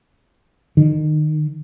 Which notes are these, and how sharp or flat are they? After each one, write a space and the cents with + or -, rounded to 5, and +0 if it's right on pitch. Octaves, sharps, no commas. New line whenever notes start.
D#3 -25